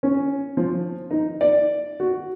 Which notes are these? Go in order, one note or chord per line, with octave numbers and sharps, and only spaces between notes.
C#4
F3
D#4
D5
F#4